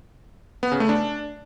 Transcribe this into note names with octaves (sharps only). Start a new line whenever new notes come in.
B3
C#3
A3
D4